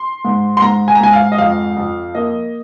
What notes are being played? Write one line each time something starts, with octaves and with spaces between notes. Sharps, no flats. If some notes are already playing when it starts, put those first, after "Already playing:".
Already playing: C6
G#2
C6
G#2 A#5
G#5
A#5
G#2 G#5
F5
D#5
F2 F5
F2
A#3 D#5